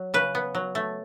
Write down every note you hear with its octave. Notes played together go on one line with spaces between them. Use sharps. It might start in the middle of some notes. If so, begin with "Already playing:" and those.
Already playing: F#3
C#3 B4
B3
F#3
A3